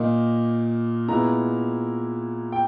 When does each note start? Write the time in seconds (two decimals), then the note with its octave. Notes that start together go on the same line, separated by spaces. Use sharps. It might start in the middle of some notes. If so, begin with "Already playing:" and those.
Already playing: A#2 A#3 D#4
1.08 A#2 G#3 B3 E4 A#5
2.52 G5